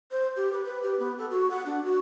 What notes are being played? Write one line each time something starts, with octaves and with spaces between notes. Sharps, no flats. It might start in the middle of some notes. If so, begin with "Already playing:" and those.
C5
G4
B4
B4
G4
B3
A4
F#4
F#5
D4
F#4